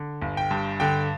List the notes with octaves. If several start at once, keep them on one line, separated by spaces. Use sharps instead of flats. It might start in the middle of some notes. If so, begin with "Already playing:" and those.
Already playing: D3
G1
G5
G2
D3 G5